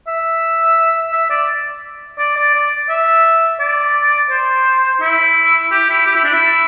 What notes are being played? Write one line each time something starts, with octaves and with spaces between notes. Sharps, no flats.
E5
E5
D5
D5
D5
D5
E5
D5
C5
E4
G4
E4
G4
E4
D4
E4